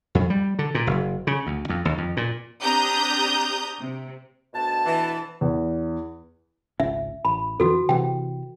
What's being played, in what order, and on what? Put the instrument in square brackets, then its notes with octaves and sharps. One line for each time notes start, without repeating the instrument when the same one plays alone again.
[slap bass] F2
G3
D3
A#2
F#1
C#3
D2
F2
D#2
F2
A#2
[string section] C4 D4 G4 A#5 D#6 G6
C3
[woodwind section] D2 B2 A5
[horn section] E3
[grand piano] E2
[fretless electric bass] G#1 C#2 C#4 [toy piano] E5
[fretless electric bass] A1 [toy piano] B5
[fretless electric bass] F2 D3 E3 [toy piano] F#4 A4
[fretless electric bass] C3 E3 [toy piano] G5